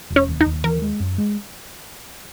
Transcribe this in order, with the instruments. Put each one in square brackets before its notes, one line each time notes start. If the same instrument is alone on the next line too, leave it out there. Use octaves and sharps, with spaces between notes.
[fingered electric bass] E1
[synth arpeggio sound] C#4
[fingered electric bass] D#2
[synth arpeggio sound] D#4
[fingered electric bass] D#2
[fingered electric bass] E3 [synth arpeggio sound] A#4
[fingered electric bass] G#3
F#2
G#3